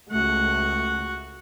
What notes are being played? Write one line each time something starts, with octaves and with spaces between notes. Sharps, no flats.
C#2 A3 F#4 F#5